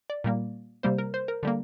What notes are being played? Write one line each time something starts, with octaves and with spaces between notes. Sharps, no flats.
D5
A#2 G3 A#3
C3 G3 A#3 C5
A#4
C5
A#4
D3 G3 A#3